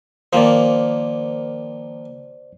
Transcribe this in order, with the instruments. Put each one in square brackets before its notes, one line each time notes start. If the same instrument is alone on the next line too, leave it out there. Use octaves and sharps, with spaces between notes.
[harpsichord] D#3 F3 A#3 [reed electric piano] C5 D5